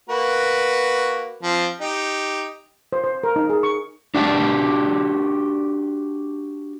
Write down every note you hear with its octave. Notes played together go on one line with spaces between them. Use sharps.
A#3 F#4 B4
F3 C4
D#4 G4
C5
C5
A#4
D#4
G#4
C#6
D4 F#4 G4 D5 A5